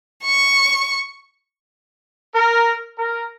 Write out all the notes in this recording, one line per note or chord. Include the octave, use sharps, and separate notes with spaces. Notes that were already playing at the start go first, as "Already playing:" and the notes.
C#6
A#4
A#4